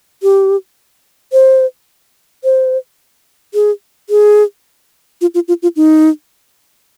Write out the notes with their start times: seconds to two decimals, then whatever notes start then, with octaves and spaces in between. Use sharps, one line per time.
0.23 G4
1.32 C5
2.44 C5
3.54 G#4
4.10 G#4
5.21 F4
5.34 F4
5.48 F4
5.62 F4
5.76 D#4